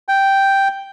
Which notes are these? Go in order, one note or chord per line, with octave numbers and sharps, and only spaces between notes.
G5